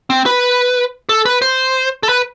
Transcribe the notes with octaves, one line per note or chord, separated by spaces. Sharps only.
C4
B4
A4
B4
C5
A4
B4